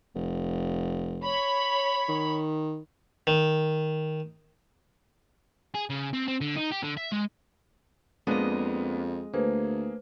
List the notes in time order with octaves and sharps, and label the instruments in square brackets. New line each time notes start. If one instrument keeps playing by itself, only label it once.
[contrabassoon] F1
[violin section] C#5 B5
[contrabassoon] D#3
[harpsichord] D#3
[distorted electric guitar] G#4
C#3
C4
C4
D3
D#4
G4
D3
E5
G#3
[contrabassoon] F2 [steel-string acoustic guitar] G#3 D#5 [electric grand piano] A#3 B3 D4
[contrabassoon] D2 [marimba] A3 B4 C5 [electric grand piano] A#3 G#4